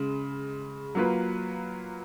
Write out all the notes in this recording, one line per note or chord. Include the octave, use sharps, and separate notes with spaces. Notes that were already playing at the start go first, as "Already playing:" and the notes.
Already playing: C#3 G#3
F#3 A#3 F4 B4